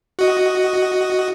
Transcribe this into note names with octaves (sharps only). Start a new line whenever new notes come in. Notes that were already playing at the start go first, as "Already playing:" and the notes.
F#4 D#5